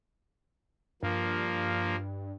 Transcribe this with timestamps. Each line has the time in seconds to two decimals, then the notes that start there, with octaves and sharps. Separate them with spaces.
1.03 G2 F3 A#3